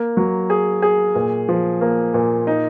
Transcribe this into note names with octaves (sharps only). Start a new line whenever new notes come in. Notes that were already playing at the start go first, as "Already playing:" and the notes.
Already playing: A#3
F#3
G#4
G#4
A#2
F3
A#3
A#2
D#4